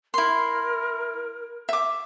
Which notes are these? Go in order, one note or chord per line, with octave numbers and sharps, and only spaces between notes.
E4 A#4 C6
E5 D6